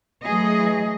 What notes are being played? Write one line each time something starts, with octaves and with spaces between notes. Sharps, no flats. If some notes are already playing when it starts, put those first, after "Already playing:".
E3 F#3 A3 G#4 D#5